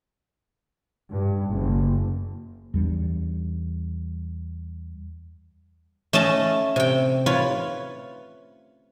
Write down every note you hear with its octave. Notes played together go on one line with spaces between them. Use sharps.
G2
F#1
E2 G3 D4
A3 C#4 D#5 A5
C3 G5
F4 B4 C#5